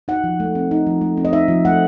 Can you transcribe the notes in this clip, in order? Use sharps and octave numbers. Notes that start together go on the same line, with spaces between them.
D#4 F#5
F3
A3
C4
D#4
F3
A3
C4
D#5
D#4 E5
F3
A3 F#5